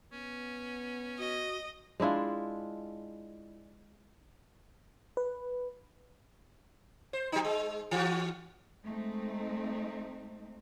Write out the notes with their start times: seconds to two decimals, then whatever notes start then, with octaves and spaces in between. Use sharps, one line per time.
0.12 B3 C#4
1.19 F#4 D#5
2.00 G#3 D4 E4 F4
5.17 B4
7.13 C5
7.32 F#3 D#4
7.45 G#3
7.91 E3 F#4
8.84 G#3 A3 C4 D#4